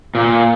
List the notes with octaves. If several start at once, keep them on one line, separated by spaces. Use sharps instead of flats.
A#2